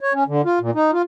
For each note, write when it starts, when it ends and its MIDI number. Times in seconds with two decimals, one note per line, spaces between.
0.01 0.13 73
0.13 0.24 61
0.28 0.42 50
0.45 0.59 65
0.61 0.71 46
0.75 0.91 63
0.93 1.02 65